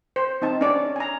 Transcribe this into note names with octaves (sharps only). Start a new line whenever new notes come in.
C5
C4 D#4 A5
C#4 D4 C#5 D5
G#5 A#5